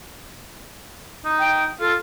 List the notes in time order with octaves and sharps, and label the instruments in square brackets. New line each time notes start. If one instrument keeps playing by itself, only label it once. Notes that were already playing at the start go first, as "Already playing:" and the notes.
[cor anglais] D#4
[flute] G5
[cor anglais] F4 [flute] A4